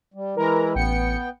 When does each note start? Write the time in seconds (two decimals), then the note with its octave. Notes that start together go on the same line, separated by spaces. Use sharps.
0.14 G3
0.37 E3 G#3 E4 A#4 A#5
0.75 A1 B3 G5 C#7